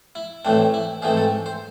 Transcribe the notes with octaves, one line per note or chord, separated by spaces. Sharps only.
E4
A2 E3 A3 C4 D4
E4
G#2 E3 A3 C4 G#4
A4
C5